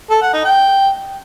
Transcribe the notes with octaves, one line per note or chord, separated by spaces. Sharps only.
A4
F#5
D#4
G5